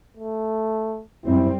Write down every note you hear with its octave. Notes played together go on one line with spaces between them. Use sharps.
A3
F#2 G3 C4 E4